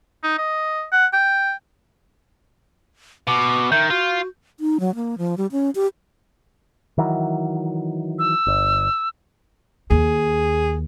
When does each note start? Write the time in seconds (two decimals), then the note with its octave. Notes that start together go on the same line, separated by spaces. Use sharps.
0.23 D#4
0.38 D#5
0.92 F#5
1.13 G5
3.27 B2 D6
3.72 D#3 E5 G6
3.90 F4 F#4
4.60 D#4
4.80 F#3
4.95 A#3
5.18 F3
5.37 G3
5.52 C#4
5.75 G4
6.98 D#3 E3 F#3
8.19 E6
8.47 G1
9.91 D#2 G#4